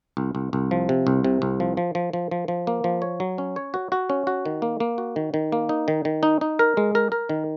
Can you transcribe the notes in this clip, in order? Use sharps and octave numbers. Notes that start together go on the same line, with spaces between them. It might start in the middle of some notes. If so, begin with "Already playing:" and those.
C2
C2
C2
F3
C3
C2
C3
C2
F3
F3
F3
F3
F3
F3
A#3
F3
C#5
F#3
C#4
C#5
F#4
F#4
C#4
F#4
D#3
A#3
A#3
F#4
D#3
D#3
A#3
D#4
D#3
D#3
D#4
D#4
A#4
G#3
A#4
A#4
D#3